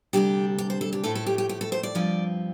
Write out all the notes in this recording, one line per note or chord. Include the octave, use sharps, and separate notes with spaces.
D2 C3 G3 D4 G4
G4
C5
A4
G4
A2 F3 A3 A4
A4
G4
G4
G4
A4
C5
D5
G2 F3 C4